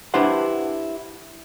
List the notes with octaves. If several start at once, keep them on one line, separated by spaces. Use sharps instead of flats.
D4 E4 G4 B4 C5 F#5